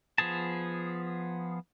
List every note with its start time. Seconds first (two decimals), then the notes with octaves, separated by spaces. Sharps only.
0.18 F3 B3 G#4 A5